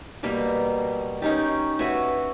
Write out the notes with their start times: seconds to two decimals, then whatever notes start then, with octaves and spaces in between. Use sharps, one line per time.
0.23 B2 G3 A#3 B5
1.22 C#4 D#4 G4
1.79 F#4 B4 C#5 E5